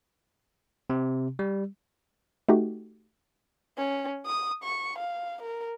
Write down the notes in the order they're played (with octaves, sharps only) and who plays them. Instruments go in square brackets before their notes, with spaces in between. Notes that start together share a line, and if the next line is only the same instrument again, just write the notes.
[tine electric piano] C3
G3
[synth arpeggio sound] A3 D#4 F#4 G4
[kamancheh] C#4
D#6
C#6
F5
A#4